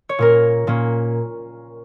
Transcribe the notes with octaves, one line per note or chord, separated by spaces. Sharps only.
C#5
A#2 A#3 C#4 A#4
A#2 A#3 C#4